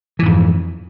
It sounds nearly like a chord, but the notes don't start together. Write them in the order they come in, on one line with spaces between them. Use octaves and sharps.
E3 G#2 F2